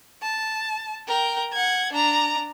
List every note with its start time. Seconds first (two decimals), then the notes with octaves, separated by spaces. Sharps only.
0.22 A5
1.07 A#4 G5
1.53 F#5 G#6
1.92 D4 A#5